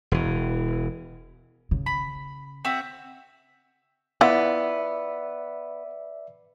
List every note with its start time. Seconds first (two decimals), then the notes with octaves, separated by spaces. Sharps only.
0.12 E1 E3
1.71 C#3
1.86 B5
2.65 C4 F#4 E5
4.21 B3 E4 F4 D5 E5